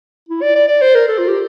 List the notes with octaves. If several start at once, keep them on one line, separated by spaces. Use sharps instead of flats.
E4
D5
D5
D5
C5
A#4
A4
F4
G4